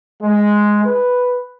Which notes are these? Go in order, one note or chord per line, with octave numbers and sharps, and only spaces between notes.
G#3
B4